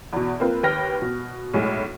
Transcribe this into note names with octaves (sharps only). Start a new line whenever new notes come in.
E2 B2
A#3 C4 F4 B4
D#2 B4 G5 F6 A#6
B2
B1 A2 G#3